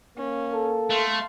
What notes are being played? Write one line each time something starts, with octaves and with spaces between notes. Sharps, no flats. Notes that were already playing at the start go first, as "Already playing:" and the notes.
A#3 C#4
A4
A3 F5 C6